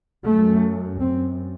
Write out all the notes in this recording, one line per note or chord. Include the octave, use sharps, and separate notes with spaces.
F#2 A3
F#2 C4